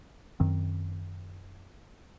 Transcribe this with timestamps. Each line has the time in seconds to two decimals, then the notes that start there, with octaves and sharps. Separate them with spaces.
0.40 F#2 D#3 C4